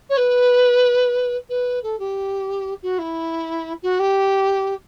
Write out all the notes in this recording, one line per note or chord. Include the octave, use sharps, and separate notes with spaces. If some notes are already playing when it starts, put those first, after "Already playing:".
C#5
B4
B4
A4
G4
F#4
E4
F#4
G4